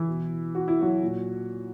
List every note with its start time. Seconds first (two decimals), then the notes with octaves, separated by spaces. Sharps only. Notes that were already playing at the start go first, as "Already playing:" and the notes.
Already playing: E3 E4
0.08 B2
0.55 F#4
0.68 E4
0.81 F#3 F#4
1.02 A#2